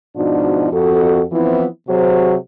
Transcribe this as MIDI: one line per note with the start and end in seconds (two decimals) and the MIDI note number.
0.16 0.69 44
0.16 0.69 47
0.16 0.69 53
0.16 0.69 62
0.16 0.69 63
0.16 0.69 66
0.72 1.24 41
0.72 1.24 66
0.72 1.24 69
1.31 1.66 52
1.31 1.66 53
1.31 1.66 59
1.31 1.66 60
1.31 1.66 64
1.88 2.36 48
1.88 2.36 54
1.88 2.36 66
1.88 2.36 68
1.88 2.36 72